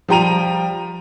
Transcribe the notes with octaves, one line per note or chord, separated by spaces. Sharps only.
F3 G3 G5 A#5 D#7 F7